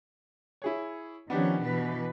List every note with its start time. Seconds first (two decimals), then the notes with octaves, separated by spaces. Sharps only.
0.62 E4 G#4 C#5
1.30 D#3 F3 B3 C#4 D4 G4
1.64 B2 E3 B4